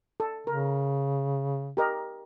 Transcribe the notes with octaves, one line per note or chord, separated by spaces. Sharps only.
A4
C#3 A#4
G4 A#4 D#5